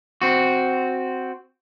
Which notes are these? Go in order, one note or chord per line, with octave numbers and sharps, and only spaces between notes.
C4 F#4